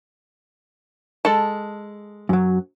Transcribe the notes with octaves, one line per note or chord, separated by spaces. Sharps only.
G#3 A4 A5
F#2 F#3